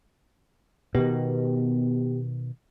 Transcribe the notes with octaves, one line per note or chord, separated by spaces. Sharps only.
B2 D#3 B3 G4